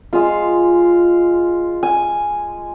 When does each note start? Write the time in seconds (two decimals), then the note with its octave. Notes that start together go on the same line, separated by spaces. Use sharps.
0.13 G#3 F4 F5
1.83 G#5